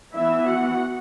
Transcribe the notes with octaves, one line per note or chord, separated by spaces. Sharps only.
E3 B3 E4 E5
F#4 F#5